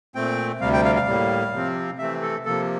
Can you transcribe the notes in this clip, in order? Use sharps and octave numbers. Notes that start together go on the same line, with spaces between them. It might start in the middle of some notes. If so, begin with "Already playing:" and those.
A#2 A3 C4 G5
D2 C3 G3 F5
G5
F5
F5
A2 G3 A#3
C3 F3 C4
C3 E3 A3 C4 E5
A4
C3 F3 A#3 A4